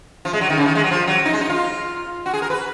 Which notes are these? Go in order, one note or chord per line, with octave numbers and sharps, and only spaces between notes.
F3
G#3
F#3
D#3
C#3
D#3
G#3
F#3
F3
F#3
D#4
G#3
D#4
F4
F#4
G#4
A#4
B4